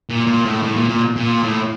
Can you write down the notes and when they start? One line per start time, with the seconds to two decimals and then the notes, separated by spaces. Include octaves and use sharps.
0.10 A#2
0.27 A#2
0.45 A2
0.63 A2
0.76 A#2
0.89 A#2
1.16 A#2
1.43 A2